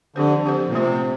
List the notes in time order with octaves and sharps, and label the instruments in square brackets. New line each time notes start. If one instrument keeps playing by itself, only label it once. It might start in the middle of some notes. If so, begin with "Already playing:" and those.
[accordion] D3 [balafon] F3 C4 G4 C5
[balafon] F3 C4 G4 C5
[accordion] A#2
[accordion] C3 [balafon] A3 C4 F4 C5